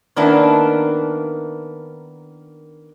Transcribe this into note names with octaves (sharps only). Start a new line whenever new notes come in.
D#3 A#3 B3 D4 E4